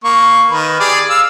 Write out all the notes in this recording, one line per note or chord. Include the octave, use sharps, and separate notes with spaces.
A#3 C#6
D#3 B4
G4 G#4 D5
F5 E6